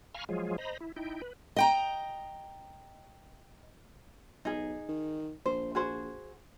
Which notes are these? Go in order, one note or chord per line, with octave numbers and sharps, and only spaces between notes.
F5 G#5 A#5 B5 C#6 F6
F3 F#3 G#3 F4 G#4
C5 D#5 A#5 B5
E4
D#4 E4 G5
B4
D#5 G5 A#5
B1 D#4 G#4
D#3
A#1 C5
F#4 G#4 C5